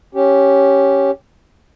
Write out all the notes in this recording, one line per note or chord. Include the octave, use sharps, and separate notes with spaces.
C#4 G4